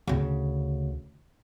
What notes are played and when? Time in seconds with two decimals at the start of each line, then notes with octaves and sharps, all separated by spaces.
0.07 D2 C#3